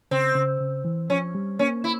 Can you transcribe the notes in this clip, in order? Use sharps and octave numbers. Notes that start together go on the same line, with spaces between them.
C#3 C4
C#3
C#3
E3
F3 C#4
G3
A#3 C#4
E4